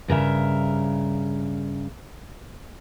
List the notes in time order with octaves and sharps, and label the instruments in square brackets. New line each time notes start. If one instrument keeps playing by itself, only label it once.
[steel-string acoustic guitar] G2 C#3 A#4 E5